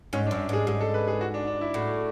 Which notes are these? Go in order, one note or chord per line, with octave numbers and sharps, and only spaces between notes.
G#2 C#4
D4
F#2
G#2 G#4
G#2 G#4
A4
B4
G#4
F#4
D4
D4
E4
A2 F#4